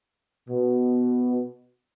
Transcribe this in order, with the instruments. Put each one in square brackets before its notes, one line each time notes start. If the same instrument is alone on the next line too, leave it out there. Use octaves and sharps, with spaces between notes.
[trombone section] B2